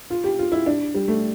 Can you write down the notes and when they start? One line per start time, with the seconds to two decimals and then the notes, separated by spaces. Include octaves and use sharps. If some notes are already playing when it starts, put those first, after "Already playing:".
0.10 F4
0.24 G4
0.39 F4
0.52 E4
0.66 D4
0.95 G3
1.08 A3